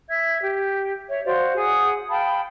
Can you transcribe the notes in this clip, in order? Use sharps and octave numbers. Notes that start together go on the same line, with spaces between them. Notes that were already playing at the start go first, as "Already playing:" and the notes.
E5 G#6
G4
C#5 E5
F#4 C5 D5 F5
G#4 F#5 D#6
F5 G5 A5 B5